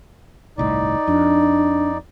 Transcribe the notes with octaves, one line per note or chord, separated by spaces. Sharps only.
G1 C2 A2 D#4 D5
F2 D4